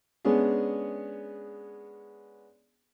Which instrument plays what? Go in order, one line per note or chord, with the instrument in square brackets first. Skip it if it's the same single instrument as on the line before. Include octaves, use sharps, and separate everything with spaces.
[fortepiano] G#3 B3 C#4 D4 G#4